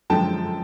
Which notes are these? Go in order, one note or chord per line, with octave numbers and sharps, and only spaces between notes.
F#2 D3 F3 G#3 G5 A5